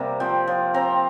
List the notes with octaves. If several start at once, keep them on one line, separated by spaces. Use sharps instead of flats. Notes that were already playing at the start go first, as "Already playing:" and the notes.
Already playing: C3 G3 A#3 A#5
F3 C4 G5
F3
C4 A#5